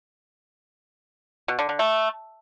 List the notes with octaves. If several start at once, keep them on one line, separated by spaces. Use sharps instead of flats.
B2
D3
D3
A3